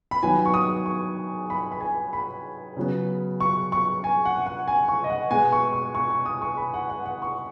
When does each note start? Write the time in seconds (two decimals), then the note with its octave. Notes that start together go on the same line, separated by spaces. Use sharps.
0.11 B5
0.22 D#3 F#3 B3 G#5
0.45 C#6
0.54 D#6
0.86 C#6
1.50 B5
1.72 B5
1.81 G#5
2.13 B5
2.77 C#3 F#3 B3
3.40 C#6
3.72 C#6
4.04 G#5
4.25 F#5
4.46 F#5
4.68 G#5
4.88 C#6
5.04 D#5
5.10 F#5
5.31 B2 G#3 B3 G#5
5.52 C#6
5.73 C#6
5.95 C#6
6.10 C#6
6.26 D#6
6.42 C#6
6.57 B5
6.74 F#5
6.89 F#5
7.06 F#5
7.22 C#6